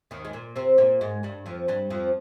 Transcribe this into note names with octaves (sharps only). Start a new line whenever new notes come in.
D#2 D#3
G#3
A#2 A#3
C3 C4
A#2 A#3
G#2 G#3
G2 G3
F2 F3
G2 G3
F2 F3